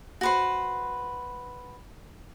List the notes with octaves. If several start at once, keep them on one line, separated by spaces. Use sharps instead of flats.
F#4 B4 C5